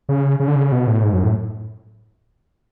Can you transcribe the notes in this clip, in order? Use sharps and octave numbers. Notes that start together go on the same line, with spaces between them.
C#3
C#3
D3
C#3
B2
A2
G#2
F#2
A2